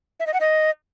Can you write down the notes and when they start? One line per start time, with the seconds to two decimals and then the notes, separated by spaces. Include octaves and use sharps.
0.20 E5
0.27 D#5
0.34 F#5
0.40 D#5